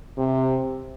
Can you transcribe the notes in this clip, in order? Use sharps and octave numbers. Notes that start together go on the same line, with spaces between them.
C3